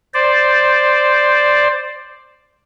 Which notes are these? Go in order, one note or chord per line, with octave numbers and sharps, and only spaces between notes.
C5 D5